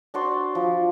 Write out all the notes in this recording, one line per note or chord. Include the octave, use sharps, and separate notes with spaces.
D4 F#4 C5 D5
F3